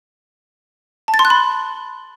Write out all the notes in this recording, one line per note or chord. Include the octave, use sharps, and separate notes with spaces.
A5
A6
C6
F#6
B5